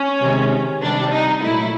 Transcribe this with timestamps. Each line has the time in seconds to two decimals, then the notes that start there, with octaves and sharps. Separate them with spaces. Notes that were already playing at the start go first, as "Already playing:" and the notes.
Already playing: C#4
0.21 C3 D#3 G#3
0.82 C3 D#3 G3 D4
1.11 D#4
1.42 A#2 F#3 A3 E4